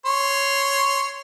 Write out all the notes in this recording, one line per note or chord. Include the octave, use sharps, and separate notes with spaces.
C#5 C6